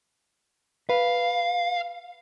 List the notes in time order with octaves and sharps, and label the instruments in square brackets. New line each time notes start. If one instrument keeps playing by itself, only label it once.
[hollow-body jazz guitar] B4 [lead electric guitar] F5